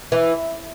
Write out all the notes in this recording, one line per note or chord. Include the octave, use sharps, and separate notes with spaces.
E3